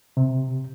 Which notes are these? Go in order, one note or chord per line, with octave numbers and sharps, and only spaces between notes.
C3